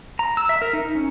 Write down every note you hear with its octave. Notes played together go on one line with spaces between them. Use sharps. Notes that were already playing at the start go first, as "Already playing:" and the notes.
A#5
E6
E5
A#4
D#4
C#4